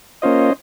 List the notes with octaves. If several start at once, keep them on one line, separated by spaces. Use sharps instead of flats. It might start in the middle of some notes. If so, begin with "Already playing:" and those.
A#3 C#4 F4 C5 D#5